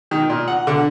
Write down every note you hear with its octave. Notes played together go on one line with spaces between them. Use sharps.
D#3
A#2
F#5
D3